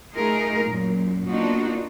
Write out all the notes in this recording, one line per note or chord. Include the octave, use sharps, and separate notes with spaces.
A3 D#4 F4 G#4 A#4
F#2 A#2
A#3 B3 D4 D#4 F4 F#4